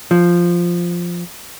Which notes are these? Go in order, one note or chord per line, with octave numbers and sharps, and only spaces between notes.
F3